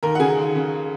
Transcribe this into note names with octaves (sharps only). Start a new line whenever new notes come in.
D#2 A#4 A#5
F#5
C#3 G#4 G#5
D#2
C#3